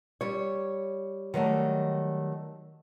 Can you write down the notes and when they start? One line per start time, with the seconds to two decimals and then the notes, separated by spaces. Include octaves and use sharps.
0.21 G3 C#5
1.34 D#3 F#3 G3 A3